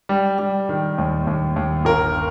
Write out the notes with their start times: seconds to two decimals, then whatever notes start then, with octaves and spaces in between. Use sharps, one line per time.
0.09 G3
0.39 G3
0.69 D#3
0.98 D#2
1.27 D#2
1.56 D#2
1.85 G1 A#4